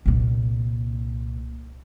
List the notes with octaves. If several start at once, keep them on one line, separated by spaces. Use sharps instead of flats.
C2 A#2